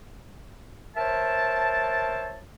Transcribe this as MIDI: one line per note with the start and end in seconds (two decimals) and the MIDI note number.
0.96 2.41 70
0.96 2.41 72
0.96 2.41 73
0.96 2.41 76
0.96 2.41 81